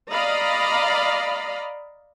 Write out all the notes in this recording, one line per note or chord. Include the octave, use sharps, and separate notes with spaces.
D5 D#5 F5 A#5 B5